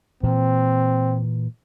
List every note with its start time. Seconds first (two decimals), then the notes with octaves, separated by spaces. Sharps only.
0.23 A#2 E3 C4